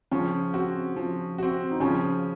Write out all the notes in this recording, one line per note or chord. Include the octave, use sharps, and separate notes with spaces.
C#3 F3 C#4
C4 F#4
F3
C4 F#4
D#4
C#3 F3 C#4